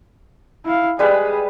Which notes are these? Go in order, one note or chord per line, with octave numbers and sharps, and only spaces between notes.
E4 F5
G3 G#3 G#4 B4